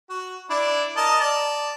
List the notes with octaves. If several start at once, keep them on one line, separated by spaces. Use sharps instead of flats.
F#4
D4 E4 D5
A#4 D#5 A5
D5 A5